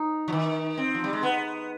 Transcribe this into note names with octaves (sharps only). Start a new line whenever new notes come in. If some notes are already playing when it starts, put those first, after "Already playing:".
Already playing: D#4
F3
D#3
C4
F3
G3
G#3
B3